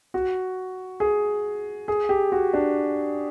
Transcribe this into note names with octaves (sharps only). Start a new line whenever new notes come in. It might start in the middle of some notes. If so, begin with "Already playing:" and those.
F#4
G#4
G#4
G4
F#4
D4